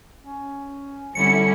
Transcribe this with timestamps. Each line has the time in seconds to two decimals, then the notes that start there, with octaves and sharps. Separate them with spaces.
0.22 C#4
1.15 D3 G3 C#4 E4 C#7